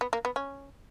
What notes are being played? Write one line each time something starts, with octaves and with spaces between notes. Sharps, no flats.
B3
A#3
B3
C#4